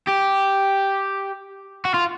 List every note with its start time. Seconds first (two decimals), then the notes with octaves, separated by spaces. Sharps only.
0.08 G4
1.85 F#4
1.94 F4